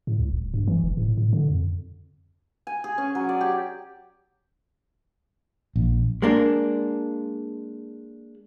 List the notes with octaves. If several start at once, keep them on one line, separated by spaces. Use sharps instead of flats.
A2
C#2
D1
G2
E3
F1
A2
A2
D3
F2
G#5
G#4
C#4
F#3
D5
G4
A#1
G#3 A#3 D4